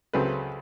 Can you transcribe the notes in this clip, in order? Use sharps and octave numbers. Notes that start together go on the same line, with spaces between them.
C#2 C#3 F#3 A3 C4 B4